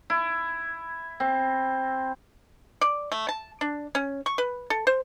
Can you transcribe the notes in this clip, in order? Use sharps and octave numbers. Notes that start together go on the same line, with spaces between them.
E4
C4
D5
A3
A5
D4
C#4
C#6
B4
A4
C5